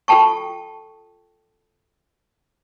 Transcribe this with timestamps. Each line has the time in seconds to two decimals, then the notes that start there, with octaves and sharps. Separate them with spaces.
0.08 F4 A4 G5 A5 C#6